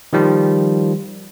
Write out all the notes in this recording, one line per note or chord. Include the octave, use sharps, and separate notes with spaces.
D#3 F3 G3 F4